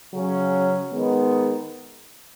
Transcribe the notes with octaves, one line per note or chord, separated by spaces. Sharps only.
C#3 F#3 C#4
D#3 G#3 B3